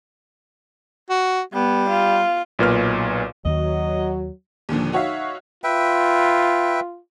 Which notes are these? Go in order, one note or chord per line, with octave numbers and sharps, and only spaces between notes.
F#4
G3 B3
F4
B1 A#2 B4 F6
D#2 D#3 F#3 D#5
D#2 A#2 D3 F3
D#4 F#4 C#5 E5 F5
F4 B4 E5 G5